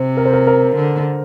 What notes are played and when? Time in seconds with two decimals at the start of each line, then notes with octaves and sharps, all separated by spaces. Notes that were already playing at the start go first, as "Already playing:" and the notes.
Already playing: C3 C5
0.17 A#4
0.25 C5
0.33 A#4
0.47 A#4
0.76 D3